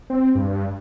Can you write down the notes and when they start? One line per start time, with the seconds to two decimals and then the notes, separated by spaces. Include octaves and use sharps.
0.10 C4
0.35 G2